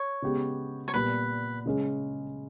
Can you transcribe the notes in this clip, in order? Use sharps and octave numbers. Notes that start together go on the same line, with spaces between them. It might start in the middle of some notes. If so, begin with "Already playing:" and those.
Already playing: C#5
C#3 G#3 B3 G4
C#5
A#2 G3 B3 B4
C#3 G#3 C#4